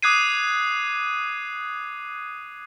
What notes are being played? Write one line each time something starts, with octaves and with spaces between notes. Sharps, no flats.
D6 D#6 F#6 G#6 C7 D#7